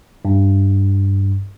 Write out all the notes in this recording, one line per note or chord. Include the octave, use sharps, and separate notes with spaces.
G2